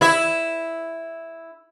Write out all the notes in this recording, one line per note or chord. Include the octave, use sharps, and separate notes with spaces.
E4 E5